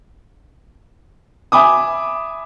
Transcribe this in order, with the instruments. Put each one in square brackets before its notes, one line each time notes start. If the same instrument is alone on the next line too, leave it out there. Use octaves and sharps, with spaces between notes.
[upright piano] E5 G#5 B5 D6 D#6